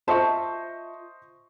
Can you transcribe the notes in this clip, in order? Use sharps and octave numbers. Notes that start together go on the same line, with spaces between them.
F4 C5 D#5 E5 A5 C#6